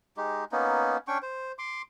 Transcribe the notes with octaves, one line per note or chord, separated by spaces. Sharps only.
G#3 D#4 G4
A#3 B3 C#4 D#4
C#4 D4 G5 C#6
C5
C6 D6